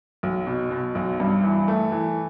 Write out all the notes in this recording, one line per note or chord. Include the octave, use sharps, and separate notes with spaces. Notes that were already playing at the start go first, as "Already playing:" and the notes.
B1
B2
B2
B1
G2
E3
A3
E3